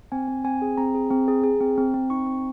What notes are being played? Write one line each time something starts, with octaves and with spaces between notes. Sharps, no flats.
C4 G#5
C4
C4 G#5
G#4
C4 A#5
G#4
C4
G#4
G#4
C4
C4
C4
D#4 C#6
C4